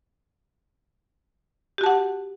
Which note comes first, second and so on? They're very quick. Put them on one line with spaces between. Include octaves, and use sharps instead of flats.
G4 F#4 A5 F#5